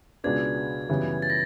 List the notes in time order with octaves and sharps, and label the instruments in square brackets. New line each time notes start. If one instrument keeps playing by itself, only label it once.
[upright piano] C#2 B2 G#3 B3 D4 [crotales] G#6
[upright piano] F#2 C#3 E3 G3 B3
[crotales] A6
A#6